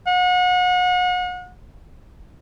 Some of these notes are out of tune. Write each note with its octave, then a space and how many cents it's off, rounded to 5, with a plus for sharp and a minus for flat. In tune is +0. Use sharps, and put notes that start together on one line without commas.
F#5 -35